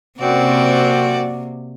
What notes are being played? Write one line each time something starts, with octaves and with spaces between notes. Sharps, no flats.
F#2 C3 A#3 C4 F#4 D5